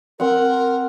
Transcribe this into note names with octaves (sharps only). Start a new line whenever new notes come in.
C4 A#4 F#5